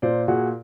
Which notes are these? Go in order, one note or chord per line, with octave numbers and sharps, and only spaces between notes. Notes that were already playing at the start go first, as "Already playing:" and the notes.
A#2 C5 D5
A#2 F#4 G#4